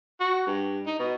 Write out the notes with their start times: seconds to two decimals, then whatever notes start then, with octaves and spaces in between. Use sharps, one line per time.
0.20 F#4
0.47 G2
0.86 D#4
0.99 B2